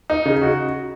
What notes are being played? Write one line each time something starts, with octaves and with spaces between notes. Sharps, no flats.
D#4
C#3
F#4